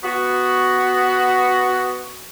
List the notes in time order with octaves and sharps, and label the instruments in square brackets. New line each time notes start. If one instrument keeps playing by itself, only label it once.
[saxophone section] B3 F#4